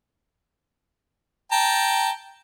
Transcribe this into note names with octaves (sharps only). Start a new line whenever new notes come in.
G5 A5 A#5